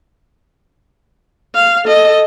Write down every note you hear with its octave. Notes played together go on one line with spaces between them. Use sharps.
F5
A4 D#5